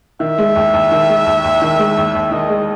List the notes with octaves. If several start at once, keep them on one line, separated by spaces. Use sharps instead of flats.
D#3 E5
G#3
D#2
D#2
D#3
G#3
D#2
D#2
D#3
G#3
D#2
D#2
D#3 D#5
G#3